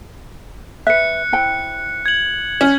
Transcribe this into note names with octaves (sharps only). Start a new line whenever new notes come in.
B4 E5 F#6 C#7
E4 C5 G5
G#6 F#7
C#4